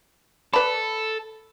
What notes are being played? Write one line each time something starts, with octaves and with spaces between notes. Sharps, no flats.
A4 B4 D5 B5